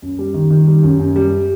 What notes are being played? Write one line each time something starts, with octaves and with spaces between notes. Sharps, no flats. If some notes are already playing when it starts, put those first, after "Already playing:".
F#2
G3
D#3
D#3
G3
F#2
F#2
G3